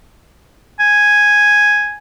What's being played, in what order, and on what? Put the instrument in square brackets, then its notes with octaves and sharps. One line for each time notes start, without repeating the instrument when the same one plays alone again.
[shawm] G#5